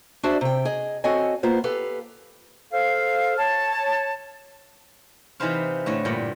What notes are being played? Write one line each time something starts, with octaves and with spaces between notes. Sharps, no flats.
D4 F#4 G#4 C5 D5 E5
C3 G5
G#4 D#5
C4 F#4 A4 C#5 D#5 G#5
A#3 B3 F4 C5
G4 A4 B4 F5
A4 C5 F5
C#5 A5
C3 E3 D#4 B4 C5 F5
A2 D3 A3 E5
G2 A#2